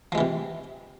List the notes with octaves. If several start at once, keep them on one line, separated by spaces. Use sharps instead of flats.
C3 E3 F3 G#3